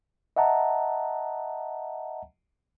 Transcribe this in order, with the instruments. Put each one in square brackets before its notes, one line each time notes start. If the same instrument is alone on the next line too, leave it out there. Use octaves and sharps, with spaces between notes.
[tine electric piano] D#5 E5 F#5 A5 A#5